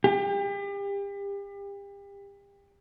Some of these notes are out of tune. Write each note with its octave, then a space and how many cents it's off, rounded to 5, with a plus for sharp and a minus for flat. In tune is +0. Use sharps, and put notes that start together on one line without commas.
G4 +35